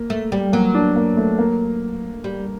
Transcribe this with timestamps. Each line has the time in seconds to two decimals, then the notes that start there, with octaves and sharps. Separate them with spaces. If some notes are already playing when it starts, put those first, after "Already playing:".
Already playing: A#3
0.10 A3
0.32 G3
0.53 F#3 A#3
0.75 D4
0.96 A#3
1.17 A3
1.39 A#3
2.24 G3